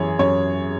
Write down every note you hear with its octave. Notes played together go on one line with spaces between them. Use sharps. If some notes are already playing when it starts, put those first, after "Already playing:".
Already playing: F#2 E3 G#4 C#5
F#2 C#5